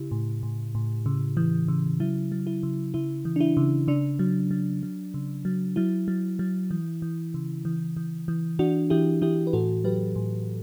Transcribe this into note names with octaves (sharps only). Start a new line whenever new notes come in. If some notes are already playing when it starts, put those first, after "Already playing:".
Already playing: C#3 E4 G4
A2
A2
A2
C#3
E3
C#3
F#3 E4
F#3
E4
C#3
C#3 E4
E3
D4
E4
C#3
C#3 D4
F#3
F#3
F#3
C#3
F#3
F#3 E4
F#3
F#3
E3
E3
C#3
E3
E3
E3
E3 D4 F#4
E3 E4 G4
E3 E4 G4
B4
A2 F#4 A4
F#3 G4 B4
A2